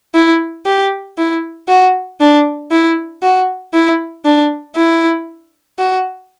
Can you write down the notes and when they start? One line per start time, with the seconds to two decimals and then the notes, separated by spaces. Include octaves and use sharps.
0.15 E4
0.66 G4
1.18 E4
1.69 F#4
2.21 D4
2.71 E4
3.23 F#4
3.74 E4
4.25 D4
4.76 E4
5.79 F#4